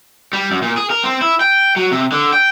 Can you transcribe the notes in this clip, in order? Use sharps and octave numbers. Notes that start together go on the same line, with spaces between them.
G3
F#2
A#2
G#4
A#4
C4
E4
G5
F#3
C3
D3
G5